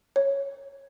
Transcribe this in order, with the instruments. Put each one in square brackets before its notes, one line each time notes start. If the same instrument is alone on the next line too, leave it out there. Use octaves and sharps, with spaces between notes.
[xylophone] C#5